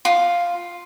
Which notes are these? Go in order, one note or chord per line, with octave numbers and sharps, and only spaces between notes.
F4